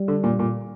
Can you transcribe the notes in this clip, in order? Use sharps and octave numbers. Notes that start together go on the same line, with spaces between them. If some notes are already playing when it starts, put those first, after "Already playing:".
Already playing: G3
D3
A#2
A#2